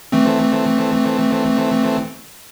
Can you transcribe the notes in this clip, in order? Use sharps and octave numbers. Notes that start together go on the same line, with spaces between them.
E3 A3 C4